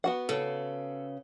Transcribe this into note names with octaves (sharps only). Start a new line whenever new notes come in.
B3 F#4 F#5
C#3 A4